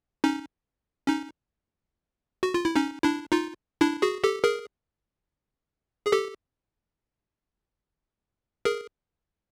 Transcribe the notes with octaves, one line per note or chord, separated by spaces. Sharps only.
C#4 D#4
C#4 D#4
F#4
F4
E4
C#4 D#4
D4 E4
D#4 F4
D4 E4
F#4 G#4
G4 A4
G#4 A#4
G#4
G4 A4
G#4 A#4